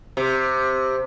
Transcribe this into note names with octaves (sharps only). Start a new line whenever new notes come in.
C3